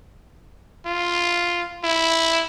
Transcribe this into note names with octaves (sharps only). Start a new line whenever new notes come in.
F4
E4